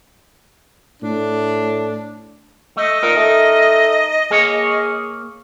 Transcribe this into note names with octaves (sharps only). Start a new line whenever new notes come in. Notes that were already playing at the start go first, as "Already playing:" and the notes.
A2 D4
A3 D#5
A#2 D#4 A#4
A3
A#3 G#4 C#5